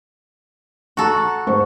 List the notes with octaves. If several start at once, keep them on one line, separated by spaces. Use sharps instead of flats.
F#4 A4 A#5 C#6
G#2 C5 C#6